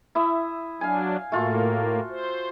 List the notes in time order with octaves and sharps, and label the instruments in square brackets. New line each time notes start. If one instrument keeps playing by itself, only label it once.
[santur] E4 E5 D#6
[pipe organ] F#3 D4 [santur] F5 G#5
[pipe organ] A2 A#3 [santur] A3 F4 F#4
[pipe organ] C5